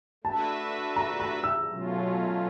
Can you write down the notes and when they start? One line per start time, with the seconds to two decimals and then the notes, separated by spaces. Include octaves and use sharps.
0.24 A3 D4 F#4 B4 E5 A5
0.96 A#5
1.20 A#5
1.44 E6
1.68 B2 F#3 A3 C#4 F4